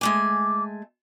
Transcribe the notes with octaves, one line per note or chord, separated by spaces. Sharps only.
G#3 A3 G#5 D6